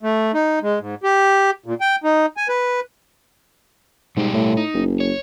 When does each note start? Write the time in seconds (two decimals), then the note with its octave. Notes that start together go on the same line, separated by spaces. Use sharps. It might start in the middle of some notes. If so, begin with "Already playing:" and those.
0.03 A3
0.34 D#4
0.62 G#3
0.79 G#2
1.03 G4
1.66 A#2
1.81 G5
2.04 D#4
2.37 G#5
2.49 B4
4.17 G#2 B2 G3 G4
4.34 A2
4.57 D#4
4.74 F#1
5.00 C#5